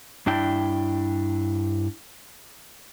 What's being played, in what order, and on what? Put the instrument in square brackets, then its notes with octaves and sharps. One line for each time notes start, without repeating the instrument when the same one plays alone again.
[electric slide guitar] G2 D4 E4 G5